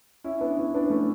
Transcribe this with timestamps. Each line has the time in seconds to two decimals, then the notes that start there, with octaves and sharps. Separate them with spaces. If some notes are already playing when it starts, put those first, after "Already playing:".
0.24 C#4 E4
0.41 B3 D4
0.58 C#4 E4
0.74 B3 D4
0.85 B3
0.90 A3 C#4